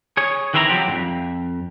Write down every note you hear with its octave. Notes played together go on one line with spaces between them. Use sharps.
G#4 C#5
D#3 E3 C4 E4 F5 A#5
F3 F#3 C4 G4
F2 G#2